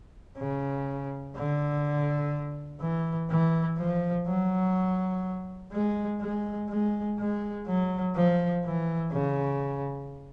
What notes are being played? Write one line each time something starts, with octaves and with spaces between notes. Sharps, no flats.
C#3
D3
E3
E3
F3
F#3
G#3
G#3
G#3
G#3
F#3
F3
E3
C#3